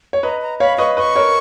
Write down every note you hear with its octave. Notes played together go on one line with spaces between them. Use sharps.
C#5
B4 D#5 A#5
A#5
C#5 F5 B5
B4 D#5 C#6
B4 D#5 C#6
A#4 C#5